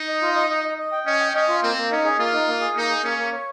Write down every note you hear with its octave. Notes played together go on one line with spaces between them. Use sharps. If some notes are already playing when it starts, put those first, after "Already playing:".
Already playing: D#4
D#5
F4
D#5
D#5
D#5
D#5
G5
C#4 D#5
G5
C#4 D#5
F4
A#3 C4
A#3
C#4 D#4
G#4
A#3 F4
D#4
A#3
G#4
A#3 D#4
G#4
A#3 C#4
A#3
C#5